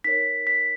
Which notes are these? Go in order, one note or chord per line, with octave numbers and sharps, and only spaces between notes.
D#4 A#4 C#5 B6
B6